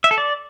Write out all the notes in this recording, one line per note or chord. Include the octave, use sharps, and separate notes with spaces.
E5
A4
D5